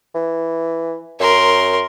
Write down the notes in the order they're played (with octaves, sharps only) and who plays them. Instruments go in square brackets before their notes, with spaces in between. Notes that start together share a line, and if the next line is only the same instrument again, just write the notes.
[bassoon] E3
[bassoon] F#2 [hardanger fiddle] A#4 C6